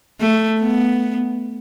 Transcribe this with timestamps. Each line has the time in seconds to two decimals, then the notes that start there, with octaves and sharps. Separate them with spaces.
0.20 A3
0.60 B3